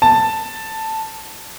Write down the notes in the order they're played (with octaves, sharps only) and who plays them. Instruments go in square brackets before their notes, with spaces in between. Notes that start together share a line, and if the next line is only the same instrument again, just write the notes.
[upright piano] A5